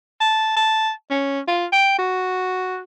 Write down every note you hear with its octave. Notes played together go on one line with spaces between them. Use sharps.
A5
A5
C#4
F4
G5
F#4